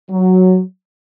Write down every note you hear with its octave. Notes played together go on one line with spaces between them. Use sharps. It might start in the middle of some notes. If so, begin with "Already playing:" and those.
F#3